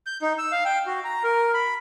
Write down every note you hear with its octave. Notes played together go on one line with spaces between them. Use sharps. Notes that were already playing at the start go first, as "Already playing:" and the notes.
G6
D#4
E6
F5
G5
F#4
A#5
A#4
B5